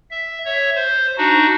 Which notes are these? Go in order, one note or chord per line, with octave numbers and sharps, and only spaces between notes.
E5
C#5 E5
C5
D4 D#4 F#4